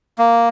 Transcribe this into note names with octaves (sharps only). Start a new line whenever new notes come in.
A#3